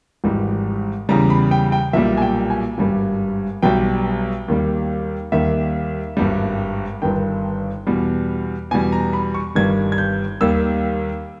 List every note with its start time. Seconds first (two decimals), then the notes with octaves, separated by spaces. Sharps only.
0.24 G#1 G#2 E3 G3
1.09 E2 C#3 E3 G3 A#5
1.30 B5
1.51 G5
1.72 G5
1.93 B1 A#2 G3 E5
2.17 G#5
2.22 G5
2.50 G#5
2.78 G#1 G2 G3
3.62 B1 B2 G3 G5
4.48 D#2 D#3 G3
5.32 D#2 D#3 G3 E5
6.17 G#1 G2 G3
7.02 G1 G2 D#3 G5
7.87 E2 B2 G3
8.71 E2 B2 G3 G#5
8.92 A#5
9.13 B5
9.34 C#6
9.55 G1 G2 D#3 G3 G#6
9.92 G#6
9.98 G6
10.41 D#2 D#3 G3 E6